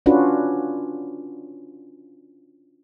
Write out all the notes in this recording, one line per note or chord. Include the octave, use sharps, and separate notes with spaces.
C#4 D4 F4 F#4 B4